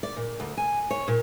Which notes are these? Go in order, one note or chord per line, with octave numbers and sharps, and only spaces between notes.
D5
A#2
D2
G#5
C#5
A#2